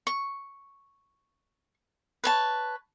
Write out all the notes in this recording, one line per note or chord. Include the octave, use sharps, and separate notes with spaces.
C#6
B4 C#5 A5